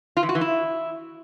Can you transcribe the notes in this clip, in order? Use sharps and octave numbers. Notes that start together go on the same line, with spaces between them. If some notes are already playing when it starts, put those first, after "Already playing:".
F4
E3
F#4
E3
E4